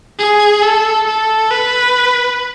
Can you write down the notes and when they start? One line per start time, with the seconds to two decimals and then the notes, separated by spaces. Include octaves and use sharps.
0.19 G#4
0.63 A4
1.07 A4
1.51 B4